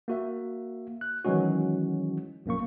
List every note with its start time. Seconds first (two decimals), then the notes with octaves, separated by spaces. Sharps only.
0.08 A#3 F#4 E5
1.01 F#6
1.25 D#3 E3 F#3 G#3 C#4 F#4
2.46 A#1 F#2 A#3 C#6